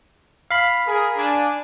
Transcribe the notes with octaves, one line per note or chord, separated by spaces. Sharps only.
F5 B5
G#4 A#4
D4 G#5